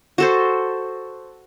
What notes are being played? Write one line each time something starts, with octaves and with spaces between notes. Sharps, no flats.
F#4 A4 C5